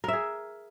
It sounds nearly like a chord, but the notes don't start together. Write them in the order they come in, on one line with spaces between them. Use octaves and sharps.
A#4 E5 G#4